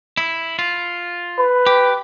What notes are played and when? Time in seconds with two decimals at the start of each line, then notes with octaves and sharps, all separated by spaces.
0.17 E4
0.59 F4
1.39 B4
1.66 G4